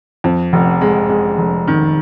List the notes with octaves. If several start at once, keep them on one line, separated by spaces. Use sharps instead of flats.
F2
F1
G#3
G#3
F1
D#3